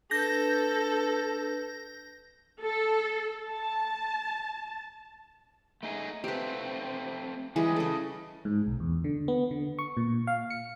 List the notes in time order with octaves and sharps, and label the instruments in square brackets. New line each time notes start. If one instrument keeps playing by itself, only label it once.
[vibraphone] D4 B4 [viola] A4 [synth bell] G6 A#6
[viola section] A4
A5
[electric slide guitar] A3 D#4 G#4
[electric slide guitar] A3 C4 [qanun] G4 B4
[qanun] E3 G#4 [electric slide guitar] G3 G#3
[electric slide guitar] C#3 [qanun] A4 D#5
[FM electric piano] G#2
B1
E2
D3
B3
D3
C#6
A#2
F5
C#7